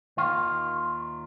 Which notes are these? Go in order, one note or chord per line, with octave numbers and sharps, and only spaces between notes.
D#2 D#3 F4